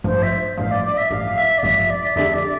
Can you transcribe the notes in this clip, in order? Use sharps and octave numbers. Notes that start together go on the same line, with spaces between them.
A1 G2 F3 C5
E5
A1 G2 F3 F5
D5
D5
E5
A1 G2 F3 F5
E5
D5
A1 G2 F3 E5
D5
F2 D3 A3 D4 G4 E5
D5